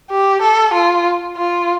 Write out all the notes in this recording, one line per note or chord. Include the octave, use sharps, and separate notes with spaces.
G4
A4
F4
F4